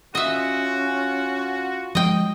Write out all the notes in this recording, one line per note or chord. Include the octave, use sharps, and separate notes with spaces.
C#4 F4 F#4 D#5 E5
F3 G#3 D#5 G5